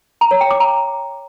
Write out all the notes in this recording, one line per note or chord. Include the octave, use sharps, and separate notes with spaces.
A#5
C#5
G5
D6
A#5